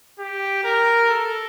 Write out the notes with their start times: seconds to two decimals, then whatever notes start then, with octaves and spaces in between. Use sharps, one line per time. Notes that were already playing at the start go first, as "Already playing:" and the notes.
0.19 G4
0.64 A#4
1.10 A4